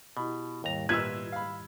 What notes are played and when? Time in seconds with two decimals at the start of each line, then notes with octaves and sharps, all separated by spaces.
0.17 B2 E4 G4 B5
0.64 D#2 G#2 D#3 G3 A#5
0.89 A#2 G4 B4 D#5 E5 E6 F6 G#6
1.32 F5 B5